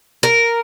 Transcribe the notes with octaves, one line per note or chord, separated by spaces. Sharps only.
A#4